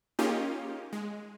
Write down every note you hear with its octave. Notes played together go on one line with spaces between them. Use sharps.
A#3 C#4 D#4 F4 G4 G#4
G#3